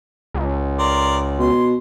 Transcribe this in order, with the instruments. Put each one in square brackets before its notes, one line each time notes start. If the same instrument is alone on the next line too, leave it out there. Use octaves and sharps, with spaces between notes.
[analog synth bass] C#2
[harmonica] A#4 D5 C6
[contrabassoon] B2 [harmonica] C6